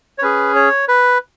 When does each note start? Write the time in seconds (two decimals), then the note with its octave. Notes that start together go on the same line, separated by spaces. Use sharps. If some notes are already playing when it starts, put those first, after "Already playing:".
0.18 C#5
0.22 C#4 G#4 B4
0.55 C#5
0.88 B4